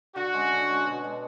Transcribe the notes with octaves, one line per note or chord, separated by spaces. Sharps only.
D3 F#4
G#3 C#4 G#4
D3
G#3 C#4 G#4
B2
G#3 D4